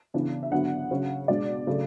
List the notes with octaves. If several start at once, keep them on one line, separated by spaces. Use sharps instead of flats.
C#3 E3 B3 D4
E5
D3 F#3 B3 D4 F#5
C#3 F#3 C#4
B2 G#3 D4 D5
C#3 F#3 A3